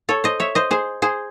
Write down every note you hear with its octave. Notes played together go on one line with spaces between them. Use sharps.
A4 C#5
C5 D#5
C#5 E5
C5 D#5
G#4 C5
G#4 C5